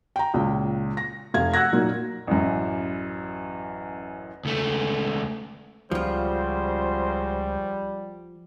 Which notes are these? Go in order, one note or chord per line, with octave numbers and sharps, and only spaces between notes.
G5 A#5
C#2 A#2
A#6
F1 C3 F5 G#6
F#5 E6 F#6 G#6 A#6
A#2 F#3 A#3 D#4
A1 F#2
C#2 A3
C#2 C#3 F3 G3 F4 F#4 C5